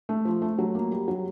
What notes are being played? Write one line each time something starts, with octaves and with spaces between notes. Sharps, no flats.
A3
F3
A3
F#3
A#3
G3
F#3